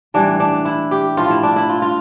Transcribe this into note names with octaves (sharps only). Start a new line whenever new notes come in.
A2 E3 G3 D4
D4
E4
G4
A2 F3 F4
E4
D4
E4
F4
F4